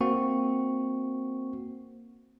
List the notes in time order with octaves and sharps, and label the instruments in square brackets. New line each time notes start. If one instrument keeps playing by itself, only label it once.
[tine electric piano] A#3 C4 F#4 C#6